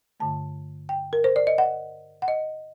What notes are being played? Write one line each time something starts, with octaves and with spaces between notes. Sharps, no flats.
G2 D3 A3 A5
G5
A#4
C5
D5
D#5
F#5
F#5
D#5